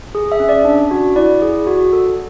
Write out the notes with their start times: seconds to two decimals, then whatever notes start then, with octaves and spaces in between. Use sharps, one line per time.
0.15 G#4
0.32 E5
0.40 C#4
0.49 D5
0.65 D4
0.91 F#4
1.16 E4 D5
1.42 G#4
1.67 F#4
1.93 A4